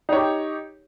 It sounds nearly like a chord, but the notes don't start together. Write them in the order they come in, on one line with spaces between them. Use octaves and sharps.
D#4 C#5 G4